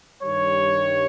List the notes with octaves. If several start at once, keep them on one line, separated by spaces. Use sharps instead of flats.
G2 D#3 G3 C#5